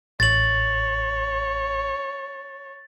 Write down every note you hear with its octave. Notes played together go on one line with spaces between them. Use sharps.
A1 C#5 A6 F#7